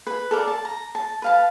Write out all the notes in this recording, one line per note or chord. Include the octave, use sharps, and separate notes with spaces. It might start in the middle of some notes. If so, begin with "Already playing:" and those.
B4
A4 A#4 D5
A5
A#5
A5
B4 F5 A5